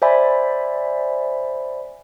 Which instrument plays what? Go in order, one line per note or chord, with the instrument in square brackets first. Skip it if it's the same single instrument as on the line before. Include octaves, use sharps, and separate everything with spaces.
[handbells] C5 D5 E5 G#5 B5